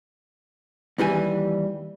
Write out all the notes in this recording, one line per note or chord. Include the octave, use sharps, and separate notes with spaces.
D#2 E3 G3 G#5